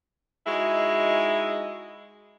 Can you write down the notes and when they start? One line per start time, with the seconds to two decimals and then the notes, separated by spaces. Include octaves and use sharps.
0.47 G#3 D#4 E4 F#4 G#4